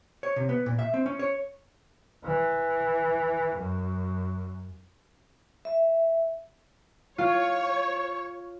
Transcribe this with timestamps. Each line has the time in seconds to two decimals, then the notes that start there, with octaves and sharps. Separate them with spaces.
0.23 C#5
0.36 C3
0.49 B3
0.66 A#2
0.79 E5
0.94 C4
1.06 C#4
1.19 C#5
2.25 E3
3.56 F#2
5.65 E5
7.18 F4 C#5